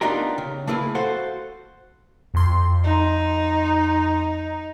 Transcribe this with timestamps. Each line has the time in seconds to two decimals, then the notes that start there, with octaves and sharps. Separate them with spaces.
0.01 B3 D4 D#4 F4 G4 A#4
0.38 C#3
0.67 A3 A#3 E4 G#4 B4
0.95 F#4 A4 C5 F5 F#5
2.34 F2 C6
2.84 D#4